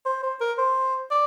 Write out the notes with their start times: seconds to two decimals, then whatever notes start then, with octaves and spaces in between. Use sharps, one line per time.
0.06 C5
0.23 C5
0.40 A#4
0.58 C5
1.11 D5